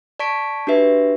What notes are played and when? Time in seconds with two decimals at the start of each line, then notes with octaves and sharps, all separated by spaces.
0.19 D5 A5 C#6 B6 D7
0.67 D4 F#4 G4 B4 E5